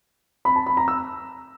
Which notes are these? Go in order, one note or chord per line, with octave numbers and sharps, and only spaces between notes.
B5
A5
B5
A#5
E6